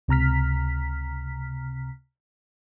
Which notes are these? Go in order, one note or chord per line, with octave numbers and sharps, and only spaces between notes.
C#2 C3 A#5 F6 B6